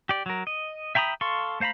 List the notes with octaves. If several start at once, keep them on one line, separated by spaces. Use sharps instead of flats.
G4 D5
F#3 A#4
D#5
E5 G5 A#5 B5 D#6
A4 F5 C6 C#6
A3 C5 F5 A#5 B5